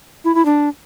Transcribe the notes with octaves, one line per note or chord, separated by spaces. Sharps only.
E4
E4
D4